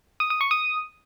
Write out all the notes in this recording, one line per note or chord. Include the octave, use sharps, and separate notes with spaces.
D#6
D#6
C#6
D#6